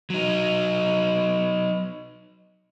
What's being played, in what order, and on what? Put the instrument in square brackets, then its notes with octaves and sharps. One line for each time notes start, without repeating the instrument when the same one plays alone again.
[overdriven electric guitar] F#3 D#4